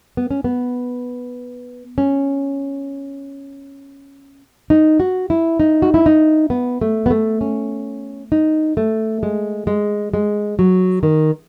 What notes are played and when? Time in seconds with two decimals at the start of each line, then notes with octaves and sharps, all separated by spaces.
0.17 B3
0.31 C#4
0.44 B3
1.98 C#4
4.70 D#4
5.00 F#4
5.30 E4
5.60 D#4
5.82 F#4
5.94 E4
6.06 D#4
6.50 B3
6.81 A3
7.06 B3
7.11 A3
7.41 C#4
8.32 D#4
8.77 A3
9.23 G#3
9.67 G#3
10.14 G#3
10.59 F#3
11.03 D#3